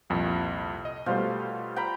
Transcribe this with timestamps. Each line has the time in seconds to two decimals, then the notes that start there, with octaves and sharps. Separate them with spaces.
0.10 C2 F2 A#2
0.85 D#5
1.06 B2 G3 A3 F4 C5
1.76 G5 A#5 B5